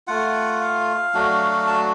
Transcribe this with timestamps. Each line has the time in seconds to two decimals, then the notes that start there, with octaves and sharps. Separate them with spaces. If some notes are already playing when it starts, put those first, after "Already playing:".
0.07 A3 F4 F#5
0.61 F5
1.14 F#3 A3 D4 F#4
1.67 A5